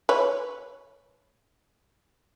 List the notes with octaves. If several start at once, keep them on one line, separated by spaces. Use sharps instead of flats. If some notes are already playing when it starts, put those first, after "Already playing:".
B4 C#5